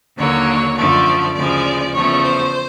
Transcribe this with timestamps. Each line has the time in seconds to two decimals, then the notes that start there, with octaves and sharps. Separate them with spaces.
0.17 D#2 D3 F#3 A#3 C#5
0.76 F#2 D3 F3 A3 D5
1.34 D2 C#3 F3 G#3 D5
1.92 E2 C#3 F3 A3 C#5
2.22 C5